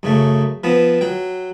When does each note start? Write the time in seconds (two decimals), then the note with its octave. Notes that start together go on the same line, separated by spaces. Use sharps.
0.03 F#2 C#3 A3
0.64 F3 B3 C4
1.01 F#3 G5